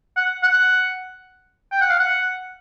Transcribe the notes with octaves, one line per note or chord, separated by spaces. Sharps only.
F#5
F#5
G5
F#5
F5
F#5